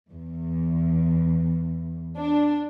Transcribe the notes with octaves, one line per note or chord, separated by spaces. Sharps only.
E2
D4